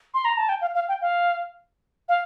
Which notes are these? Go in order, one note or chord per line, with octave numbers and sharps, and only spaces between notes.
C6
A#5
A5
G5
F5
F5
G5
F5
F5